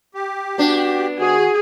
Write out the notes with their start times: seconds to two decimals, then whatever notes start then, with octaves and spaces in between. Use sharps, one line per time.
0.15 G4
0.58 B3 D4 F#4
1.19 D#3 F#4 G#4